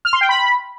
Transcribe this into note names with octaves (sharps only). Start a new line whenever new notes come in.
F6
C6
G5
B5